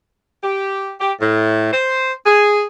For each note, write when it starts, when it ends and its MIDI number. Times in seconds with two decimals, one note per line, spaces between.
0.42 0.91 67
0.99 1.11 67
1.19 1.72 45
1.72 2.12 72
2.25 2.64 68